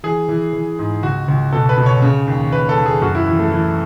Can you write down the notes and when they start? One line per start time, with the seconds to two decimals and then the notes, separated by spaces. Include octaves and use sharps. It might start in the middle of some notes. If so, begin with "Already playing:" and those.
0.03 E3 G#4
0.29 E3
0.53 E3
0.79 G#2
1.03 C#2 F#4
1.28 C#2
1.53 B2 A4
1.69 B4
1.78 B2
1.86 C#5
2.02 C#3
2.27 D#2
2.52 D#2 B4
2.69 A4
2.77 D#2
2.86 G#4
3.02 F#2 F#4
3.15 E4
3.27 E3
3.39 A3
3.52 E3